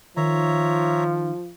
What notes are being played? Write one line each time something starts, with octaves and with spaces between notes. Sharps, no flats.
D#3 F3 C#5 E5 A#5